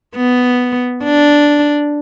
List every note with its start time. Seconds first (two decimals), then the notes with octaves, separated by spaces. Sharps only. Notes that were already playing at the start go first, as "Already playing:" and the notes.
0.16 B3
1.04 D4